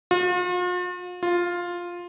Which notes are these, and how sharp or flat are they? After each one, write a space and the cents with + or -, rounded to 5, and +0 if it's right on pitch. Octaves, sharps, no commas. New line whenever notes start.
F4 +45
F4 +5